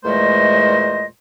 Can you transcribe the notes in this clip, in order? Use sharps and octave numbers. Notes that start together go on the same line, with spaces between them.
E2 A#2 G#3 A3 C5 D#5